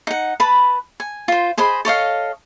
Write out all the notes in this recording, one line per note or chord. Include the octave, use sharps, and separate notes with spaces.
D#4 F#5
B4 A5 B5
G#5
F4 C5
G#4 C5 D#5 B5
A4 C#5 D#5 F5